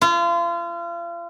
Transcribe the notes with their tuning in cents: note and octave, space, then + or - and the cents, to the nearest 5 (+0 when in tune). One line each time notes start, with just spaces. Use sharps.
F4 -35